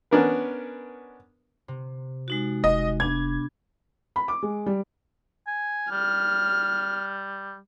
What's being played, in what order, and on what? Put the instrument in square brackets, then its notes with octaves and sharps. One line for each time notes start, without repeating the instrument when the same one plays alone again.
[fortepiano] B3 C#4 D4 A#4 B4
[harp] C3
[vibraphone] G#3 D#4 F#4
[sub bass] F1 [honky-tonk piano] D#5
[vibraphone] B3 D4 [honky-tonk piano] G#6
[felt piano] B5
D6
G#3
G3
[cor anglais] G#5
[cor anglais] G3 [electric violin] F6